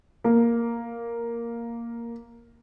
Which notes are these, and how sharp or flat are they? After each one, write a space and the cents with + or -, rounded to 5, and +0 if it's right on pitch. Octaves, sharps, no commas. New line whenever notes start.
A#3 +0